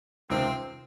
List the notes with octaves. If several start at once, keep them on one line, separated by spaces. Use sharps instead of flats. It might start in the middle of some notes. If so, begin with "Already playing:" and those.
C#2 C3 D#3 C4